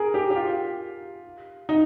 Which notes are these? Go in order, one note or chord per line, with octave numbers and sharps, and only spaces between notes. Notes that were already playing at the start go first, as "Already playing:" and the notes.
Already playing: G#4 A#4
G4
G4
F4
D#4